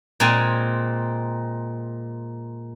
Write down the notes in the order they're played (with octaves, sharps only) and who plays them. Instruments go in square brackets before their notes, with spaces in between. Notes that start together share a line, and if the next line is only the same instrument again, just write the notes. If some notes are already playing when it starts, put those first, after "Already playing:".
[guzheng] A#2 G#3 C4 G#5